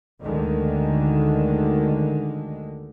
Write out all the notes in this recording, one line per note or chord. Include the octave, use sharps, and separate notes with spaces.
D2 D3 D#3 G#3